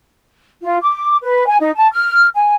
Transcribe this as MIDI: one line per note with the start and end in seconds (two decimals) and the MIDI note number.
0.61 0.75 65
0.80 1.14 86
1.22 1.45 71
1.46 1.56 80
1.60 1.69 63
1.75 1.87 81
1.91 2.26 89
2.33 2.53 80